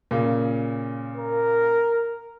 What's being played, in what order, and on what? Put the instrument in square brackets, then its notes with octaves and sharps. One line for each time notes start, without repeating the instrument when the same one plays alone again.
[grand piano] A#2 C#3
[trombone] A#4